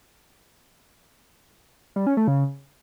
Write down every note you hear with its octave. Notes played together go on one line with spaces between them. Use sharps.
G3
C#4
A3
C#3